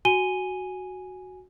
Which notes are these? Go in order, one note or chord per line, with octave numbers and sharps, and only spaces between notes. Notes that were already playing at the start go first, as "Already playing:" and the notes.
F#4 G#5 D#7 G7